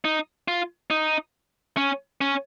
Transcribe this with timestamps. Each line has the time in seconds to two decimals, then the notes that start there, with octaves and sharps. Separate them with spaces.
0.05 D#4
0.48 F4
0.90 D#4
1.77 C#4
2.21 C#4